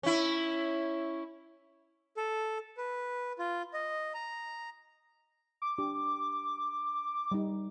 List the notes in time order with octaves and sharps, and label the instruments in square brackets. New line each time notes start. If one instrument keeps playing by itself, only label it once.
[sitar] C#4 E4
[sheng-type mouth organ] A4
B4
F4
D#5
A#5
[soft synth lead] D6
[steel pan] D4 G4
G3 D#4